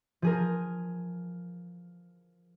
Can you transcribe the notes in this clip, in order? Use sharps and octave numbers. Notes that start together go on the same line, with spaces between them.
F3 G#4 A#4